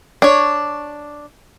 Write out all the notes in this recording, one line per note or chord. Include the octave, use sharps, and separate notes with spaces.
D4 C#5